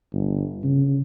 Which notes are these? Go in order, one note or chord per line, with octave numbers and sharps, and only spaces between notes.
G1
C#3